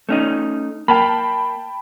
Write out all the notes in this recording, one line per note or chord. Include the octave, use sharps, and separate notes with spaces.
A3 C#4 D#4
A#3 G5 A5 B5